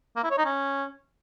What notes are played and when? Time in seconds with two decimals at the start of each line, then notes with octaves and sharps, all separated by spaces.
0.16 A#3
0.23 E4
0.31 C#5
0.38 D#4
0.45 C#4